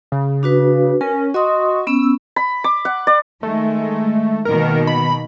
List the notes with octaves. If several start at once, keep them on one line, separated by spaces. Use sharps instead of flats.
C#3
D4 F#4 B4
C#4 A#4
F#4 D#5 C6 D#6
B3 C#4 E6
B5
D6
F#5
D5
D#3 G#3 A3
B2 D#3 A#3 A#4
B5